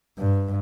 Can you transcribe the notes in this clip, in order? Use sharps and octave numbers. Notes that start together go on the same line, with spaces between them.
G2